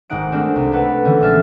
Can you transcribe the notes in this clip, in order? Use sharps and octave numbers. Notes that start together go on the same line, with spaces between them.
G#1 G#2 G#3 D#4 F#5 D7
G#3 A3 C4 D4 A#4
C2
A4 B4 F#5
D3 E3 C4 C#4
A#1 G#3 E5 F6 A6